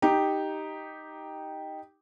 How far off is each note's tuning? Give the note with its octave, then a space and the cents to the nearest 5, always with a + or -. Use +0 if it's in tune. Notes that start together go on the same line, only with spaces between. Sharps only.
D#4 +0 G4 +0